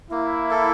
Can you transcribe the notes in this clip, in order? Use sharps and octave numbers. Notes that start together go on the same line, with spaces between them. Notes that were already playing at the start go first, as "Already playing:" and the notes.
A#3 E4
A4